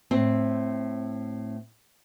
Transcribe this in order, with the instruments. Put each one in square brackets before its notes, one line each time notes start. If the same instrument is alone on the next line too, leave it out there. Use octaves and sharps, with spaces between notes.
[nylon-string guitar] A2 C4